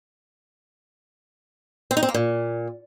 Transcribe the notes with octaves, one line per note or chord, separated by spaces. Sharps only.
C4
D#4
C4
A#3
A#2